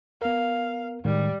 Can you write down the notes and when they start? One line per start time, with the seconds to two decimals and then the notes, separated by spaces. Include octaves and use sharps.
0.22 B3 A#4 F5
1.05 A2 D#3 G3 G#3